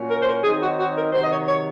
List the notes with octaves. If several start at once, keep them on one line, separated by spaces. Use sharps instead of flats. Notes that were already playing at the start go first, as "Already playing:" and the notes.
Already playing: A#2 F#3 C#4
A#4
C5
A#4
D#3 F#3 C4 D#4 G#4
F#4
F#4
A#4
C3 D#3 F#3 C5
D#5
C#5
C#5